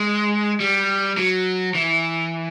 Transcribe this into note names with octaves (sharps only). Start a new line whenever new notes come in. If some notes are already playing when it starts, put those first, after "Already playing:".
Already playing: G#3
G3
F#3
E3